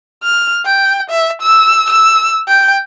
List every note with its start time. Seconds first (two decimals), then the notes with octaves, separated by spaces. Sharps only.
0.23 F6
0.65 G5
1.10 E5
1.42 E6
1.90 E6
2.48 G5